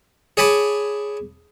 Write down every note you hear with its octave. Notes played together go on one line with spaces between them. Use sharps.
G#4 C#5 G#5 A5 B5 D6